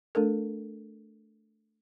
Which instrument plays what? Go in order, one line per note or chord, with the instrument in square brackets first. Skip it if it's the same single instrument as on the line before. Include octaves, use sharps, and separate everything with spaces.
[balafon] A3 D4 A4 A#4